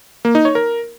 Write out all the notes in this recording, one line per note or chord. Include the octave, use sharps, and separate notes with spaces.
A#3
D#4
C#5
A#4